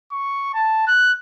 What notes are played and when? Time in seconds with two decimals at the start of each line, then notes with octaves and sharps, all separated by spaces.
0.12 C#6
0.54 A5
0.88 F#6